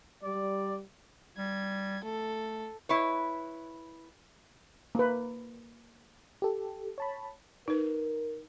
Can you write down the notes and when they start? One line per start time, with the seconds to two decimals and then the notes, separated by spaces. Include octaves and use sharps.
0.23 G3 D5
1.38 G3 G#6
2.04 A3 A4
2.89 E4 B4 C#5
4.95 A#3 B4
6.42 G4 A4
6.98 C#5 A5 B5
7.68 D#4 A#4 B4